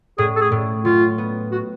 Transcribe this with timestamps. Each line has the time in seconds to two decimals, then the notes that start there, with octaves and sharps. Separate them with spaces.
0.18 A2 G#4
0.36 A4
0.41 G#4
0.52 A2
0.85 F#3 F4
1.18 B3
1.52 F#4